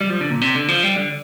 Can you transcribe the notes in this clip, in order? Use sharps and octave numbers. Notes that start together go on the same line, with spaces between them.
G3
F3
D3
A#2
C3
D3
F3
G3
D3